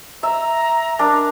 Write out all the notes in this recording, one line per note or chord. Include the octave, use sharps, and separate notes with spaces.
E5 A#5
D4 A#4